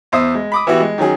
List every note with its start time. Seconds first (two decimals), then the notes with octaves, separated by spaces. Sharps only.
0.12 E2 C5 E5 D#6
0.34 G#3
0.52 B5 D6 D#6
0.67 E3 B3 E4 F#4 G4
0.80 G#3
0.98 D#3 F#3 C#4 G#4